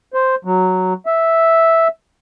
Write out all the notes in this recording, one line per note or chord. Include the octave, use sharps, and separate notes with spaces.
C5
F#3
E5